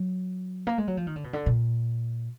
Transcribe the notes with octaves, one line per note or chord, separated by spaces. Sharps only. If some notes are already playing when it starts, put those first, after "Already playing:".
Already playing: F#3
A#3
G#3
F#3
F3
D#3
D3
B2
D3
A#2